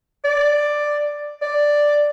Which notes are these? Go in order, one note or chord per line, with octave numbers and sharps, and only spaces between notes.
D5
D5